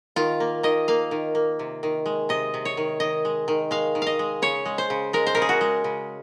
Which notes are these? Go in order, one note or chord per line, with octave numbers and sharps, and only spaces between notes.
D#3 F4
A#3
D#3 D#5
A#3 F5
D#3
A#3
C3
D#3
G#3
C3 D#5
C3
C#5
D#3
D#3 D#5
G#3
D#3
G#3 F5
D#3
D#5 F5
G#3
C#3 C#5
G#3
C5
C#3
G#3 A#4
C5
C#3 A#4
G#4
F#4
G#3
C#3